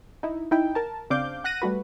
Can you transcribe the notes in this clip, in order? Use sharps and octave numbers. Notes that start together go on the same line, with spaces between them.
D#4 E4
D#4 E4 G5
A#4 A5
C#3 C4 D4 F5 D6 G6
F#5 F#6 A#6 D#7
G3 A3 F#4 B4